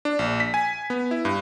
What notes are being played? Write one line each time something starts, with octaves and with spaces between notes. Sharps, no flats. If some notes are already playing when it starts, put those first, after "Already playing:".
D4
A#1
B6
G#5
B3
E4
G2